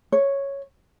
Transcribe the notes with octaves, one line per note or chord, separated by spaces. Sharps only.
C#5